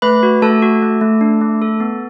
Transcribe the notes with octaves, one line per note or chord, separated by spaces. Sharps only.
A3 B4 B5
F#4
A3 A4 A5
F#4
A3
A3
D4
A3
A4
B3